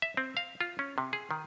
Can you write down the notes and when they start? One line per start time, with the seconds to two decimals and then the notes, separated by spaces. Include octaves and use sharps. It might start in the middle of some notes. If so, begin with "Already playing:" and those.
0.02 E5
0.17 C4
0.37 F5
0.61 F4
0.79 C#4
0.98 C3
1.13 G#4
1.31 D#3